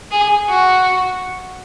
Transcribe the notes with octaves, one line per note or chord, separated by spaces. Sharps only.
G#4
F#4